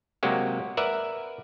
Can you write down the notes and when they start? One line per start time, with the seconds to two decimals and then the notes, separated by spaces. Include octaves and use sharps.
0.23 C3 F#3 G#3 A#3 F#4 G4
0.77 A#4 B4 D5 E5 F#5